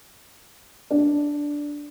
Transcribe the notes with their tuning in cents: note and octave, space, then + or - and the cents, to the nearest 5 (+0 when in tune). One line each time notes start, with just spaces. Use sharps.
D4 -5